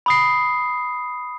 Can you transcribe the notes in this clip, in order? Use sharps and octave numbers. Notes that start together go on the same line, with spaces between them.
B5 D#6 C7